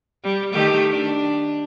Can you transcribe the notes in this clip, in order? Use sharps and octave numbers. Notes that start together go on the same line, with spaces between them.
G3
D#3 A3 G4
D4